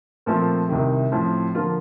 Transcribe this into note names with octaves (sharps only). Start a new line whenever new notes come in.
A#2 F3 A3 C4
C2 C3 D#3
A2 F3 C4
D3 F3 A#3 F4